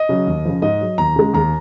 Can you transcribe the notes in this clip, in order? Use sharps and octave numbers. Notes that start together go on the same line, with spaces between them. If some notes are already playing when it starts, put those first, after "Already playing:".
Already playing: D#5
C#3 F#3
D#2
C#3 F3
G#2 D#5
F#3
D#2 A#5
C#3 G#3
D#2 A#5